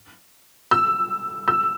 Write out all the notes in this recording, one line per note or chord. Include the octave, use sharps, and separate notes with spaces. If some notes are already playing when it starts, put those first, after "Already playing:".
E6
E6